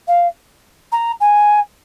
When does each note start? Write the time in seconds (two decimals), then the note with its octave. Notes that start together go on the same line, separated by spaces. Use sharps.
0.07 F5
0.92 A#5
1.20 G#5